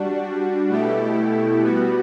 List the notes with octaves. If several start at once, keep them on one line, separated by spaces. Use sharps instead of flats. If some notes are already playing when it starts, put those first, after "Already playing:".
Already playing: G3 D4 F#4
B2 A3 E4 G4
G3 B3 F#4